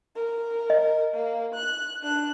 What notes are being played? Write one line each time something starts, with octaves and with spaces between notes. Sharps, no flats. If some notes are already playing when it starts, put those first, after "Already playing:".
A#4
D#5
A#3
F#6
D4 F#6